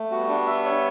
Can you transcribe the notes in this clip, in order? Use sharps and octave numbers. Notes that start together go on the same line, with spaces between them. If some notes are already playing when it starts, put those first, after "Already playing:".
Already playing: A3
G3 B3 F#4
D4
E5
C#5